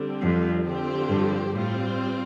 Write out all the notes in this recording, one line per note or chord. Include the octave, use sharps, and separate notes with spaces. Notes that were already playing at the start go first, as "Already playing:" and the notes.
Already playing: D3 G3 C4
F2
D3 F3 C4 G4 C5
G2
A2 G3 C4 F4 C5